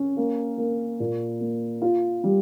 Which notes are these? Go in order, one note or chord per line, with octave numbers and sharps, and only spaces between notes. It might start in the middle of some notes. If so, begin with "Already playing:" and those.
Already playing: C#4
A#3
A#3
A#2
A#3
F4
G3